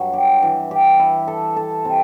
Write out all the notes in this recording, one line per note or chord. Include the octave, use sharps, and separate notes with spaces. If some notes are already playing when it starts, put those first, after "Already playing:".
Already playing: G2 F#3
G4
E3
G4
E4
A4
A4
C3